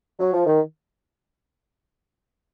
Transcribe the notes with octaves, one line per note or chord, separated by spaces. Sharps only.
F#3
F3
D#3